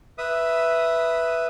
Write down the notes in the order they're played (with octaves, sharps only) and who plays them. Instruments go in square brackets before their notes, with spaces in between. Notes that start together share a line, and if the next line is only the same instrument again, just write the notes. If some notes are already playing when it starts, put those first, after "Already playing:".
[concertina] B4 E5 D#6